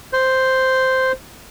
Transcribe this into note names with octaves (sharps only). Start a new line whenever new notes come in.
C5